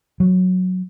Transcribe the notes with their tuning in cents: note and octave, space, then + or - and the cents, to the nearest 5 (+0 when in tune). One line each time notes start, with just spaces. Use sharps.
F#3 -10